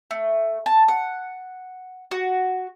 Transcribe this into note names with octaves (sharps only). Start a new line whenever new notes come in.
A3
A5
F#5
F#4